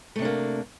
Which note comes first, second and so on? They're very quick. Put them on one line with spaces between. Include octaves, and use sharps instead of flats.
A3 C3 D4 A#3